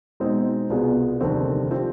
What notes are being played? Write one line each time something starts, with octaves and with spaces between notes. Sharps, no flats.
B2 G#3 C4 D#4
C2 B2 B3 F4 G#4
F1 D#2 D3 G3 C4
F3 C4 G4